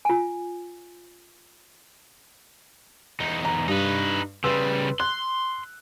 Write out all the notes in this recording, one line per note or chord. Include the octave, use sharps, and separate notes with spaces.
F4 G#5
E2 D#4
A#5
G2 D#4 B4
C#3 G3 B4 C6 E6
C6 F#6